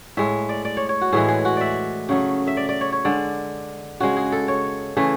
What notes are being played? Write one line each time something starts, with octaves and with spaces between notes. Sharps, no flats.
A2 G#3 E5
D5
D5
C#5
C#5
F#4
A2 E3 G#3 G#4
G#4
F#4
D5 E5
C#3 F#3 A3
E5
D5
D5
C#5
C#5
D3 G#3 D5
C#3 G#3 F#4
G#4
A4
C#5
C#3 E3 A3